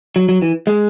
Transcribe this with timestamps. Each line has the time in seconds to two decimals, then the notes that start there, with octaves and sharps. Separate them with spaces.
0.16 F#3
0.29 F#3
0.42 E3
0.67 G#3